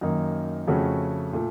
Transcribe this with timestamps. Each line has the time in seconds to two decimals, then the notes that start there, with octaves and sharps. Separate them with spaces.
0.01 F#2 D#3 A#3 D#4
0.67 F2 C#3 A3 C#4 F#4
1.33 A#2 A3